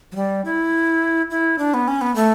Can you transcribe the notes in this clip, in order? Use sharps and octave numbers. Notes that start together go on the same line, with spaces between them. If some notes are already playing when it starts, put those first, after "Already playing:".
F#3
G3
E4
E4
D4
B3
C#4
B3
A3